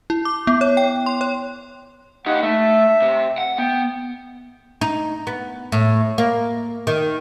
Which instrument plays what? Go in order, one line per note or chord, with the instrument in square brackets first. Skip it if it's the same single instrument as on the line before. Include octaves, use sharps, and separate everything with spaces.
[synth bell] E4
D6
B3
C#5
G5
C6
C#5
[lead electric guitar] D#4 G4 [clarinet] F#5
[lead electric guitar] A3 [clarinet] E5
[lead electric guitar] C3
F#5
[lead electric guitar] B3 [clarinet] G5
[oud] D#4
B3
A2
A#3
D#3